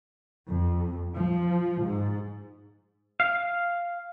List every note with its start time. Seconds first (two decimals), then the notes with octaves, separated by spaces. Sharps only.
0.47 F2
1.16 F3
1.84 G#2
3.20 F5